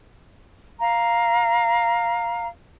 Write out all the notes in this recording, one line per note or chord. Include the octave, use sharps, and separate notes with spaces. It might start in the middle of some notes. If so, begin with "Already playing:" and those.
F5 A#5